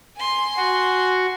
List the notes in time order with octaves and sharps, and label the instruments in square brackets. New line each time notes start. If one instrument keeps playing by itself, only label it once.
[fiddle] G#5 C6
[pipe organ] F#4